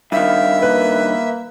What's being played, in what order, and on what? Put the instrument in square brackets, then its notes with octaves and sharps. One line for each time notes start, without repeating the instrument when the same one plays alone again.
[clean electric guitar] G2 D#3 [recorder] E5 [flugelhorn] F5
[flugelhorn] A#3 [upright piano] B4